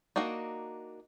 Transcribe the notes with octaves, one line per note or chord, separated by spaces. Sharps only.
A#3 D4 D#4 F#4